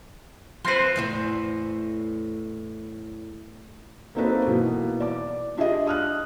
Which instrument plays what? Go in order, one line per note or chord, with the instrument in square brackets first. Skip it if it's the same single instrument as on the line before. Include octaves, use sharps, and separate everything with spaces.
[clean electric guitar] F3 C4 B4 [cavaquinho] C5 C6
[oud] E2 A2 C5
[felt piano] A#3 C4 D#4 F#4 A4 B4
B2 E3 A#3
D5 D6
D4 F4 G4 G#4 D#5
D#6 F6 F#6